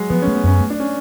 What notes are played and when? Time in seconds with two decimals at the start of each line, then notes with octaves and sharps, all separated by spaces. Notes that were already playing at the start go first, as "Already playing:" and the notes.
Already playing: F#3 G#3
0.10 F3 B3
0.22 C#4
0.27 A3
0.35 B3
0.44 F#2 C#4
0.60 A3
0.70 D4
0.80 C#4